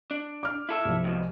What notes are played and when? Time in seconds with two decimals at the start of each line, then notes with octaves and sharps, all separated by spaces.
0.11 D4
0.43 D6 F6
0.69 E4 A4 E5
0.85 C2 F3
1.04 D#2 G#2 B2